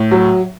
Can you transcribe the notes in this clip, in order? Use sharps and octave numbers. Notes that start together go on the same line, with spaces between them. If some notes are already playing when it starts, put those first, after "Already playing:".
Already playing: A2
F#3